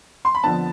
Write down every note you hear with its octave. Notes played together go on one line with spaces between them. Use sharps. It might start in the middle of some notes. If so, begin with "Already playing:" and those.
C6
B5
F2 D3 F3 B3 A5